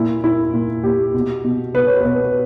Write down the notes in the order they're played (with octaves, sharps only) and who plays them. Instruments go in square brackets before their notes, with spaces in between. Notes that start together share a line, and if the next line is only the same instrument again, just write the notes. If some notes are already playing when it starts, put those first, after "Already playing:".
Already playing: [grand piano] A#2 E4
A#2 E4
A#2
A#2 G4
B2
B2
B2 B4
C#5
B2 B4